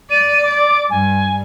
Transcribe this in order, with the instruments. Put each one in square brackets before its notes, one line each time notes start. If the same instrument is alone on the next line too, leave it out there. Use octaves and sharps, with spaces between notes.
[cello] D5 [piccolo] D#7
[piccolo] D6
[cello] G2 [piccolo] G#5